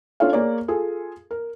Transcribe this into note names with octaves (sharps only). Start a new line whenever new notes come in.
C#4 D4 F4 A4 C#5 F5
A#3 G#4 C#5 D5
F4 G#4 A4
A#4